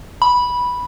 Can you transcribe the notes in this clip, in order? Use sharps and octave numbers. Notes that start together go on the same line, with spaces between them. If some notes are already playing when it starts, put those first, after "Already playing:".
B5